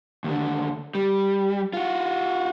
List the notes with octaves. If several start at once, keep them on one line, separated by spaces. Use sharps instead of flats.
D#2 D3
G3
F4 F#4